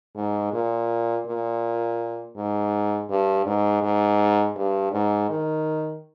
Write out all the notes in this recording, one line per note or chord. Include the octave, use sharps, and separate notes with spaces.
G#2
A#2
A#2
G#2
G2
G#2
G#2
G2
G#2
D#3